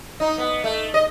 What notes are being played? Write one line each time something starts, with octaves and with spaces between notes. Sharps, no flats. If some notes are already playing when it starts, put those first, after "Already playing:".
D#4
B3
A3
D#5